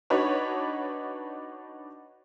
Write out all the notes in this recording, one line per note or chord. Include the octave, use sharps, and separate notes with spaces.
D4 D#4 F#4 B4 C#5